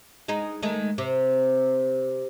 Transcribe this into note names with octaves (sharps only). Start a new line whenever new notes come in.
G#3 D#4
D#3 G#3 A3
C3